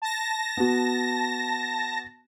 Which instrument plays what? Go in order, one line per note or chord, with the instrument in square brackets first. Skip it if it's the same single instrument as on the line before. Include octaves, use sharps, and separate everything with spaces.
[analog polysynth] A5 A#6
[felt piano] B3 F#4